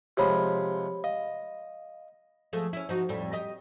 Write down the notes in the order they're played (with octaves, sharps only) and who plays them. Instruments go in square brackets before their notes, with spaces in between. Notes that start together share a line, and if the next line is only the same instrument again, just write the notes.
[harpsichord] C3 F3 G#3 [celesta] G4 C#5 B5
[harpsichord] D#5 [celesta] F5
[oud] F3 G#3 A3
C#4 E4
F3 D#4 F#4
F2 A2 G3
G4 D#5